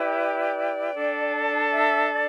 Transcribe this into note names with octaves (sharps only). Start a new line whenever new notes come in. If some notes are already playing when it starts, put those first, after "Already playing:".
Already playing: E4 G4 B4 D5 G5
D4 A4
E5
D5